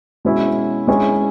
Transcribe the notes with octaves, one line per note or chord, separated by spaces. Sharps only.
B2 G#3 C#4 E4
G#3 C#4 E4 G#4 C#5